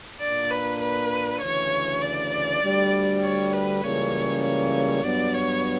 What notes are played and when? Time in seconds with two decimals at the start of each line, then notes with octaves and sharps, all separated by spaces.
0.20 A#2 A#3 D4 D5
0.51 B4
0.81 B4
1.41 D2 C#3 E3 C#5
2.02 D5
2.62 D2 D3 G3
3.23 C#5
3.53 B4
3.83 C#2 C#3 E3 G3 A#3 C#5
4.44 C#5
5.04 G2 F#3 B3 D5
5.34 C#5